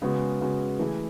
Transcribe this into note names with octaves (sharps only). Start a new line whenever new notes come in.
C#3 G#3 B3 F#4
C#3 G#3 B3 F#4
E3 A3 E4 G#4